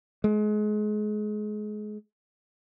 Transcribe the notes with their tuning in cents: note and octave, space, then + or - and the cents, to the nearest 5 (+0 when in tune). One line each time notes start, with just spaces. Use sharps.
G#3 +30